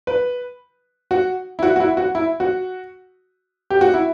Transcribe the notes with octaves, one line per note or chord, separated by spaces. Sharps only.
B4
F#4
E4
F#4
F#4
E4
F#4
E4
F#4
G4
F#4
E4